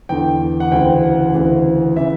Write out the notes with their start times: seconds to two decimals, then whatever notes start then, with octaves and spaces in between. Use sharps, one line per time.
0.09 E2 D3 G5
0.60 F#5
0.71 D2 C#3 E3 G5
1.03 F#5
1.34 D2 C#3 E3
1.96 C#3 E3 E5